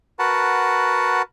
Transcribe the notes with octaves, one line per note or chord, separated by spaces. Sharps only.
F#4 A#4 B4 F#5 A5